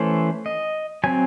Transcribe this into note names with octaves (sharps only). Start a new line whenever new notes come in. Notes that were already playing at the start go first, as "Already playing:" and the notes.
Already playing: E3 A3 C#4 C5
D#5
F#3 C4 G#5